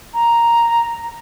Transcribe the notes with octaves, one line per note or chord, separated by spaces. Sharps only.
A#5